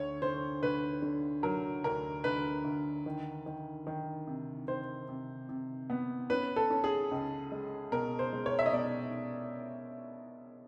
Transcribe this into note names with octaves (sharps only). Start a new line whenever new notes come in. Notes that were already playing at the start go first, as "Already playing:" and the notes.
Already playing: D2 C#5
D3 C5
D2 B4
D3
F#3 A#4
D2 A#4
D2 B4
D2
D#3
D#3
D#3
C3
D#3 C5
C3
C3
B3
C#4 B4
A4
C#4
G#4
C#2
G#3
B2 A#4
C5
G#3
C#5
E5
D#5
B2 D5